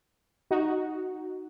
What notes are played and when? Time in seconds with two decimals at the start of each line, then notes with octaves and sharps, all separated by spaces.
0.51 D#4 F#4